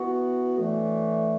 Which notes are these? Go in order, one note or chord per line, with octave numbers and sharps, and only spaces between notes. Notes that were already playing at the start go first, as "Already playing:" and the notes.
Already playing: E3 B3 F#4
A2 E3 A3 D4